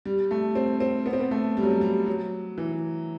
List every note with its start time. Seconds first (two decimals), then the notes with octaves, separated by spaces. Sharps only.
0.05 G3
0.31 A3
0.55 C4
0.80 C4
1.06 B3
1.13 C4
1.20 B3
1.31 A3
1.57 G3
1.63 F#3
1.71 G3
1.81 G3
2.07 F#3
2.58 E3